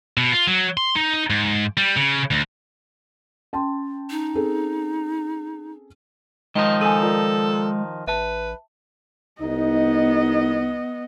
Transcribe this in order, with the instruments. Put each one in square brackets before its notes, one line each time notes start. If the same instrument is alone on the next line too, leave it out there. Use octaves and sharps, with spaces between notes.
[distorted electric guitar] B2
F4
F#3
C6
D#4
G#2
G3
C#3
D2
[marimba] C#4 C6 [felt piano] G5 A5
[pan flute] D#4
[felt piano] C4 G#4 A4
[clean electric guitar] D#3 F3 D#4 [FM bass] G#3 [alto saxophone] D#5 [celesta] G7
[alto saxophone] A4 [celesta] G#5 D#7
[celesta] F4 A#4 D5
[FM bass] A1 [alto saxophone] B4 [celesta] E5 A5
[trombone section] C2 D#4 [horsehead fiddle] B3 D#5